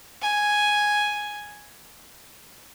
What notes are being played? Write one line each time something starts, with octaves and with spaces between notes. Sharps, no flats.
G#5